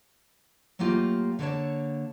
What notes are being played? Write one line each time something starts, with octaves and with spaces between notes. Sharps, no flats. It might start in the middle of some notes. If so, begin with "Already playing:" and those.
F#3 A3 A#3 F4 G4
D3 A#3 A4 C5 C#5 A5